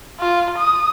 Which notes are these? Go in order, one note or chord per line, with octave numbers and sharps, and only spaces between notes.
F4
D#6